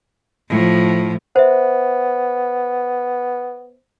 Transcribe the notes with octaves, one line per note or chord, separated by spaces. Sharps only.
A2 F3
B3 C5 E5